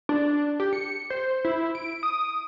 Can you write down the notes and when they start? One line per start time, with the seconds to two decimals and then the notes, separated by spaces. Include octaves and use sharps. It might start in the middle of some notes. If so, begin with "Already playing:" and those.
0.09 D4
0.60 G4
0.73 C#7
1.10 C5
1.45 E4
1.75 D7
2.03 D#6